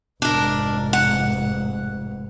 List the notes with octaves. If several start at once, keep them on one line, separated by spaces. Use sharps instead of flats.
F1 G#2 D4 A#4
F#5